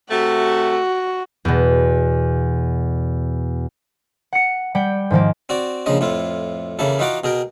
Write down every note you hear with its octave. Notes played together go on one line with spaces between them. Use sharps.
C3 A3 F#4
E2 B2
F#5 C#7
G3 F#5 G5
G#2 D#3 F3 A#3
C4 F#4 D5
A#1 C#3 F3 D#5
F2 A2 E4 F4
C#3 E3 A#3 E4 A4
E3 D#4 F4 F#4 F#5 D6
B2 G#4 A#4 G5